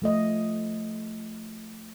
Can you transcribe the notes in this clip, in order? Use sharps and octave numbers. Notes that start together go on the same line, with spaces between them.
F3 A3 D#5